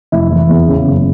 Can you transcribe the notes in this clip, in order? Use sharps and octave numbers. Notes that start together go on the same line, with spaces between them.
F1 E4
E3
E2
C#3
F#1